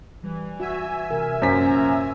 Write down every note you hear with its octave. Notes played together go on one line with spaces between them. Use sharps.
E3 G3
F#4 E5 G#5 E6
C3 A#4
F#2 A#2 A#3 C#4 C5 A#5 B6